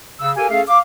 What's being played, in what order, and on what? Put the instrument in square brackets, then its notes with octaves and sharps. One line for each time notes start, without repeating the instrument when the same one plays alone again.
[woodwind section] C#3 E6
G4 A4 A#4 F5 G#5
A3 C#4 G#4 A4 F5
F5 D6